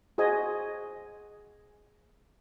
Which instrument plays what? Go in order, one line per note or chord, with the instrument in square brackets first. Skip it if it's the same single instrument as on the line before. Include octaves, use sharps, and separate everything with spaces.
[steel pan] F#4 G#4 C5 D#5 G#5